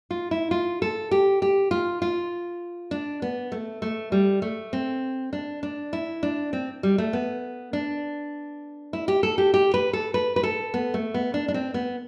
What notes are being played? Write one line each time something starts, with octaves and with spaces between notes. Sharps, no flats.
F4
E4
F4
A4
G4
G4
F4
F4
D4
B3
A3
A3
G3
A3
C4
D4
D4
E4
D4
C4
G3
A3
B3
D4
E4
G4
A4
G4
G4
B4
A4
B4
B4
A4
B3
A3
B3
D4
D4
C4
B3